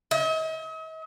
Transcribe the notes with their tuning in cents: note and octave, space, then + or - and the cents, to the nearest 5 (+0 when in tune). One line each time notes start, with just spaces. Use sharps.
D#5 +45